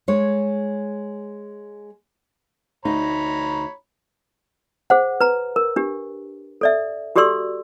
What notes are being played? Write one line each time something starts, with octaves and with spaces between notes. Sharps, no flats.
G#3 C#5
D2 D#4 C#5 A#5 B5
G#4 C5 F#5
B4 A#5
A#4
D4 G4
A4 D5 E5
F#4 G4 A4 D5 C6 E6